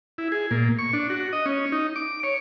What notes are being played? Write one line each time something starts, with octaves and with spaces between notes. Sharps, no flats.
E4
G#4
A#2
C#6
D4
F#4
D#5
C#4
D#4
D6
C#5